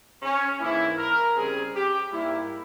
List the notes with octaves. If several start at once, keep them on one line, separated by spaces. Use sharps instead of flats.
C#4
G#2 E3 A#3 E4
A#4
C#3 G3 C4 G#4
G4
G#2 G3 A#3 E4